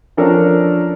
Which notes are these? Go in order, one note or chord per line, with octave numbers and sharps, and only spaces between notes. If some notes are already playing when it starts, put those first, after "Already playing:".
F3 C#4 D4 A4 A#4